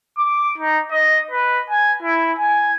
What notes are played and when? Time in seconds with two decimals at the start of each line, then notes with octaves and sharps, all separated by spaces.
0.18 D6
0.58 D#4
0.91 D#5
1.31 B4
1.70 G#5
2.03 E4
2.39 G#5